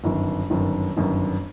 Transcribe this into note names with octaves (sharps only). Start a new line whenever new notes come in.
G1 F#2 D#3
G1 F#2 D#3
G1 F#2 D#3